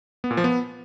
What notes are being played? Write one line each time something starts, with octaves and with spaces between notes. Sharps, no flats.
B3
A#2
F3
B3